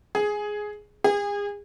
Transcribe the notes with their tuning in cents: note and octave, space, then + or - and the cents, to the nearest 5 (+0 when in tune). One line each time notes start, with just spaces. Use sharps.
G#4 +5
G#4 -35